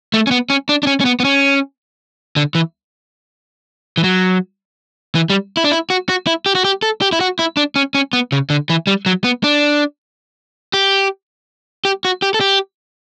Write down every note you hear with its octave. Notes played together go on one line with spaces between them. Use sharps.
A3
C#4
B3
C#4
D4
D4
C#4
C#4
B3
B3
C#4
D3
E3
E3
F#3
E3
G3
E4
D4
E4
F#4
F#4
E4
G4
F#4
G4
A4
G4
E4
F#4
E4
D4
C#4
C#4
B3
C#3
D3
E3
G3
F#3
B3
D4
G4
G4
F#4
G4
A4
G4